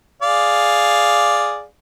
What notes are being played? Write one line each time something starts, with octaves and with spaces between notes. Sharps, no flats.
G#4 D5 F5